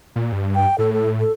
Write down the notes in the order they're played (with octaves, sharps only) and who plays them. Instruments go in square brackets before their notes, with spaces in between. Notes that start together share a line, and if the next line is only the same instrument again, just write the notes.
[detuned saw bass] A#2
G2
[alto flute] G5
[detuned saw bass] A2 [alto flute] A4
[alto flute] A4
A4